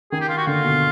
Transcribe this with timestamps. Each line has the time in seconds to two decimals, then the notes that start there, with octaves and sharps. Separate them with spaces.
0.12 D#3 G#4
0.21 G4
0.29 F4
0.37 F#4
0.47 D3 F4
0.65 B2